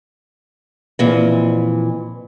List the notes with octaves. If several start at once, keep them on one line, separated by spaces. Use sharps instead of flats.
F2 A#2 E3